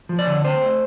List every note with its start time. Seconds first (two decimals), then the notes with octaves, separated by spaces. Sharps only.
0.09 F3
0.19 D5
0.27 D3
0.44 C4 C5
0.62 A3